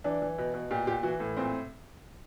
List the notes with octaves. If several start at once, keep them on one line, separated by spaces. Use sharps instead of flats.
E3 D4
E3
B2
B2
A#2 G4
A#2 G4
E3 F#4
A2
A#2 C4